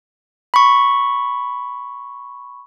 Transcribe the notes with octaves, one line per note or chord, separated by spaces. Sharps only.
B5 C#6